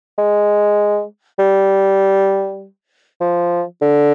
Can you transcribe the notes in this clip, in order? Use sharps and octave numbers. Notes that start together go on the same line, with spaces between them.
G#3
G3
F3
D3